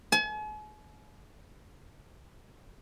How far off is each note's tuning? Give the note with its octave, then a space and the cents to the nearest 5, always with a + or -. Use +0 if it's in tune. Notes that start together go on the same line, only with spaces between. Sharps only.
G#5 +45